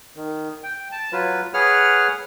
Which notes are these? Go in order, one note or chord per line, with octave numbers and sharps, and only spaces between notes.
D#3
G5
A5
F#3 F4 B4
G#4 B4 C#5 F#5 F6